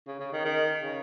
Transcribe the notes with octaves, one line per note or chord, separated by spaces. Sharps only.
C#3
C#3
D#3
D#3
C#3